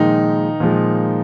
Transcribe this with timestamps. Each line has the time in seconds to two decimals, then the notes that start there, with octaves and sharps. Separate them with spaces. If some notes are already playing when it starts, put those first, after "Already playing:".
Already playing: A#2 D#3 F3 G#3 D#4
0.60 A#2 F3 G#3